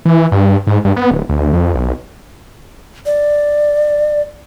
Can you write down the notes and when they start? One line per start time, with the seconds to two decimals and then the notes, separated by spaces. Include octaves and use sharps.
0.05 E3
0.32 G2
0.67 G#2
0.85 G2
0.96 B3
1.11 D1
1.29 D2
1.53 F2
1.74 B1
3.06 D5